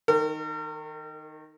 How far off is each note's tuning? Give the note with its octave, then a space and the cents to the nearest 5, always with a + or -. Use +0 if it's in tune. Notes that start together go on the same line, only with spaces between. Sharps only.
D#3 +0 A#4 -40